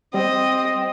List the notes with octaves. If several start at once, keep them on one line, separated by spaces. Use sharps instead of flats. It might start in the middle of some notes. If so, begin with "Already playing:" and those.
G3 C4 D#5